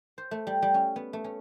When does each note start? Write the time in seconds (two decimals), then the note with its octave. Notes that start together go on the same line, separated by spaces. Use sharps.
0.18 C5
0.31 A3
0.47 G3
0.62 G3
0.74 C#4
0.96 B3
1.13 A3
1.24 C#4